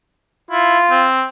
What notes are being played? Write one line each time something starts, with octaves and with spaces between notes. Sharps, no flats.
E4 F4
C4